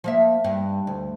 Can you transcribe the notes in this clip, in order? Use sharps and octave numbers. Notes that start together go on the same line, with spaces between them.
F3 A#3 E5
G2
D2